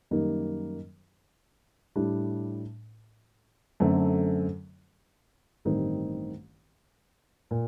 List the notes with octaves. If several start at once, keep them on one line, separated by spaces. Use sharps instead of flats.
F#2 D#3 G3 A#3 D#4
A2 G3 D4
F#2 D3 A3 C4
A1 G2 D#3 G3 C4
A#2